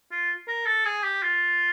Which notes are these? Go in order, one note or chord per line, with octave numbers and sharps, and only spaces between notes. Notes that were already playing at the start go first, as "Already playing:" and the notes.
F4
A#4
A4
G#4
G4
F4